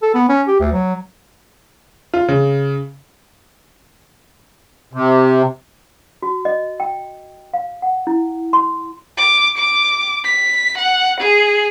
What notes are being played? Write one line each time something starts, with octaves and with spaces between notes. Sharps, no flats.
A4
B3
C#4
G4
D2
F#3
F4
C#3
C3
F#4
D#5
G5
F5
F#5
E4
C6
D6
D6
B6
F#5
G#4